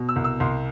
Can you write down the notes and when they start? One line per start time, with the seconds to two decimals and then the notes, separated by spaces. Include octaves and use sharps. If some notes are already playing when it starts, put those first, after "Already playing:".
Already playing: B2
0.09 E6
0.16 C2
0.24 E6
0.40 C2 C6